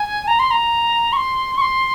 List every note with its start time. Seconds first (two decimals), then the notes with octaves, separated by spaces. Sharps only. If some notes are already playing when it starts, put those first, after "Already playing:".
Already playing: G#5
0.27 A#5
0.39 C6
0.51 A#5
1.13 C#6
1.17 C6
1.57 C#6
1.61 C6